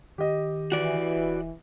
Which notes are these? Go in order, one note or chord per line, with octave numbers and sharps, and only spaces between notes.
D#3 G4 D#5
E3 F#4 D5
D#1